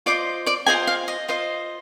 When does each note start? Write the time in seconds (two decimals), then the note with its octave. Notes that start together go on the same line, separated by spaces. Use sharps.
0.06 F4 C5 D5 D#5 D6
0.46 D5 D6
0.66 F4 G#4 C5 D#5 G#5
0.87 F5
1.08 D#5
1.28 F4 C5 D#5